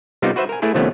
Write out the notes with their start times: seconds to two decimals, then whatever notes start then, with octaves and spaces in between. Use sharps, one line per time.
0.22 C3 G3 B3 D#4 F4 A#4
0.36 F#4 B4 C5 E5
0.49 A#4 G#5
0.62 A3 E4 G#4 B4
0.74 C3 D#3 F3 A3 B3 C#4